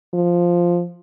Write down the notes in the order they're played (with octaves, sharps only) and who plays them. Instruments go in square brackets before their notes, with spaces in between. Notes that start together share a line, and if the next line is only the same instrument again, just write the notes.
[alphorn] F3